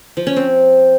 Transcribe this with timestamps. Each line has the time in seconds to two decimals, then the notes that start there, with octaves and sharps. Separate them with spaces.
0.17 F3
0.27 C#4
0.36 C4